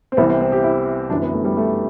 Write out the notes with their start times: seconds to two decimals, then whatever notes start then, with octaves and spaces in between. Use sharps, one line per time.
0.12 C4
0.17 C2 C3 E3 B3
0.29 C4
0.41 C4
0.52 G4
0.64 E4
1.10 G1 F#2 E3 D4
1.22 B3
1.33 A3
1.44 G3
1.57 A3